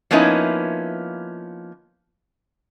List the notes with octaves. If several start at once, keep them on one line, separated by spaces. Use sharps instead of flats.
F3 A#3 B3 C#4 D#4 E4